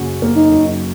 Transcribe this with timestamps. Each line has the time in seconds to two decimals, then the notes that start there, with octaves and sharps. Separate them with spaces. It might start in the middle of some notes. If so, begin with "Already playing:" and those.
Already playing: F#2 C#3 F#3 A#3
0.22 A#3
0.36 D#4
0.50 F#2